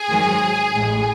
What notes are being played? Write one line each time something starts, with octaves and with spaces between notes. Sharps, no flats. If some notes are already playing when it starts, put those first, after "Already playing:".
Already playing: G#4 G#5
G#2 D#3 F#3
A1 A2 G#3